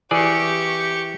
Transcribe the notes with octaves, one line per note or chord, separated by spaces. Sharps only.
E3 G4 G#4 D5 C#6